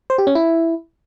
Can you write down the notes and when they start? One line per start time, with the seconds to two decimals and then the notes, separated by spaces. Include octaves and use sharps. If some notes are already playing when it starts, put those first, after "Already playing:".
0.10 C5
0.18 G4
0.27 C#4
0.35 E4